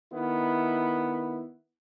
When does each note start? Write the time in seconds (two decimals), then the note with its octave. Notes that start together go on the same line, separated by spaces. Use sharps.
0.12 D#3 B3 E4